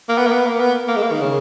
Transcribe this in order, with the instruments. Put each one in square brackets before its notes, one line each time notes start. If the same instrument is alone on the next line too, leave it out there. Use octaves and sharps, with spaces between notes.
[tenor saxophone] A#3
B3
A#3
B3
A#3
B3
A#3
G#3
A#3
D#3
C#3